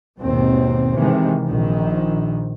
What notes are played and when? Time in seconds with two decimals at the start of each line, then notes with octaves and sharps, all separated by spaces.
0.20 G#1 D#2 B2 C4
0.98 C3 D#3 E3 G#3
1.48 A#1 D#3